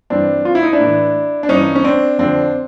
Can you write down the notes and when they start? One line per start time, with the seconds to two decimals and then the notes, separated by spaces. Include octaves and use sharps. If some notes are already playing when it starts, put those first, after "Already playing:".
0.10 G2 E3 C4 D4
0.45 F4
0.55 E4
0.63 D#4
0.73 D4 E4
0.80 A2 E3
1.43 D4
1.49 G2 E3 C#4 D#4
1.76 C#4
1.84 C4 D4
2.18 F2 D3 F3 C4 D4